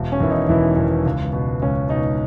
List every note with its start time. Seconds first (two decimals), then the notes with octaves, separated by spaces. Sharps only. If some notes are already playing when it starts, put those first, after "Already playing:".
Already playing: E1
0.12 C#4
0.20 E2 D#3 E4
0.30 D#4
0.49 E1 E3 E4
0.77 E2 D#3
1.06 C#2
1.33 B2
1.62 C#2 C#4
1.89 B2 D#4